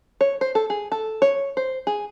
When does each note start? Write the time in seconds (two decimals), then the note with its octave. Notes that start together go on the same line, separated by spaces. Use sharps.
0.21 C#5
0.41 C5
0.55 A4
0.70 G#4
0.92 A4
1.22 C#5
1.57 C5
1.87 G#4